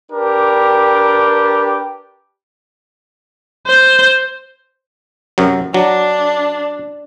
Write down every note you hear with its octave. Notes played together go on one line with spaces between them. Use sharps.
D4 G4 A#4 B4
C5
F#2 C3 F#3
F#3 D4